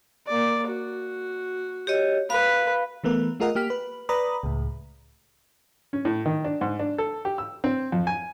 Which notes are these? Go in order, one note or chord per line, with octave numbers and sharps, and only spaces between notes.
A#3 D5
F#4
G4 C#5 D#5
B4 F5 B5
E3 A3 B3 A#4
A3 F4 G#4 A#4 D#5 F#5
A#3 G4 F6 B6
B4
B4 D5 A#5 B5 D#6
C#2 A2
C#4
A2
D#3
D4
G#2
D4
A4
G4
E6
C4
F2
G#5